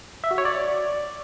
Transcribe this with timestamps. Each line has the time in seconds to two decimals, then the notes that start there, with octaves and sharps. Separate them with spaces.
0.24 E5
0.31 F#4
0.38 C#5
0.45 D5